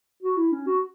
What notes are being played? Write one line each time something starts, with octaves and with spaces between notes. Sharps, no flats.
F#4
E4
C#4
F#4